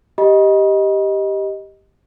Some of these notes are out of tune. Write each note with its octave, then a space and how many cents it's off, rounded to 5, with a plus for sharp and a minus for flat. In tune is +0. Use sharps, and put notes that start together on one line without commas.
G4 +0 D#5 +5 B5 -40